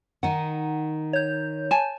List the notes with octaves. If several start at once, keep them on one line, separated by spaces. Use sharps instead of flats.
D#3 D#4 F#5
C#5 G6
G#5 A5